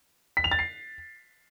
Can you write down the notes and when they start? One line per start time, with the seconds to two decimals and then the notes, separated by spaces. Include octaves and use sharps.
0.37 B6
0.44 F7
0.51 A6
0.59 C7